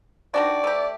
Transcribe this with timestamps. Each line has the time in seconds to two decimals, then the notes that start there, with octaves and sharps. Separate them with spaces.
0.34 D#3 D4 F#4 D5
0.64 A3 G4